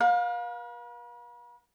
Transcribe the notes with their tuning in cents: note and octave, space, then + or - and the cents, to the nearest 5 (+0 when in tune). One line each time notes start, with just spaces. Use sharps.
B4 -45 F5 +30